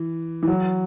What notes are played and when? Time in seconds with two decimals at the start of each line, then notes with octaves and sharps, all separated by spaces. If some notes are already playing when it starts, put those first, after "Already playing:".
Already playing: E3
0.43 E3
0.48 F#3